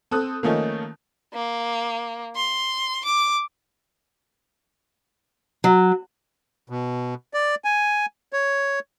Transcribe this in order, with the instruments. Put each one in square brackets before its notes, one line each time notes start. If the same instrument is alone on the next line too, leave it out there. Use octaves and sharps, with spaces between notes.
[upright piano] C4 A4 D#6 F#6
D#3 F3 A3 A#3 C#4 D#4
[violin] A#3
C6
D6
[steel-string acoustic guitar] F#3
[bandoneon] B2
D5
G#5
C#5